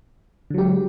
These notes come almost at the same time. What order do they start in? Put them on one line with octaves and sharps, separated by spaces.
D3 F#3 G4 G#3